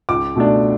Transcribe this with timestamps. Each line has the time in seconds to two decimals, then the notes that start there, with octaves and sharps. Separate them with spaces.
0.09 C#2 D6
0.36 B2 A3 D4